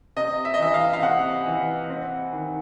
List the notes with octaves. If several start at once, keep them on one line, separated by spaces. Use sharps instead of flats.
C3 D#5
E5
D#5
E3 E5
F5
F5
C3 F#5
E3
C4
D#3